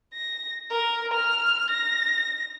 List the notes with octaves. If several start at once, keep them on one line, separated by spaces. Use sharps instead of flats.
A#6
A#4
F6
A#6